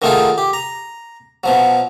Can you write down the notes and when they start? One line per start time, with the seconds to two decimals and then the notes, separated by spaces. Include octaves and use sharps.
0.02 D#3 F#3 A3 D#4 F4 G#4
0.38 G4
0.53 A#5
1.44 B2 F3 F#3